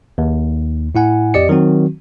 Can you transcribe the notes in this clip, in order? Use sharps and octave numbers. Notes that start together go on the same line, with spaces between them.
D#2
A2 E4 F#5 G#5
F2 G4 D5 D#5 C#7
D#3 F#3 C4 F#4